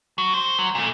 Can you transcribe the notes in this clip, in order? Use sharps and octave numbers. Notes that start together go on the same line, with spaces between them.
F#3
C5
F#3
A#2 A3